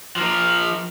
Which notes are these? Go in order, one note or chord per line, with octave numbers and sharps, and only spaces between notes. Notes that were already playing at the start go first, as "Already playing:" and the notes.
F3 A#4